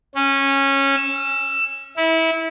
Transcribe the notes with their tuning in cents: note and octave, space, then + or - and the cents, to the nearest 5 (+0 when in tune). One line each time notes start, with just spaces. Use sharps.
C#4 -15
E6 +15
E4 -25